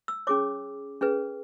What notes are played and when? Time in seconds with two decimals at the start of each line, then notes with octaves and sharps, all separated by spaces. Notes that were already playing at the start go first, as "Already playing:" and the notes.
0.08 E6
0.27 C#4 G#4 C#5 D6
1.01 C#4 G#4 B4